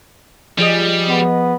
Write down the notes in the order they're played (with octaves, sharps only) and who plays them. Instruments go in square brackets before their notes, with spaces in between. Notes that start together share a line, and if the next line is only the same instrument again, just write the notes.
[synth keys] F3 G#4 D#5 [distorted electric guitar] G3
[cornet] B3